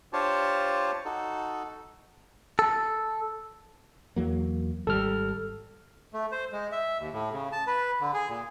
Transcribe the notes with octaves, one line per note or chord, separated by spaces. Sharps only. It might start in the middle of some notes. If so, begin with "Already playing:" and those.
D4 F4 G4 C5 C#5 A5
D#4 F#4 A4
A4
E2 F#3 A#3
G#1 G3 A4 F6
A3
C5
G#3
E5
D#2
A2
C#3
A5
B4
D3
G#4
A#2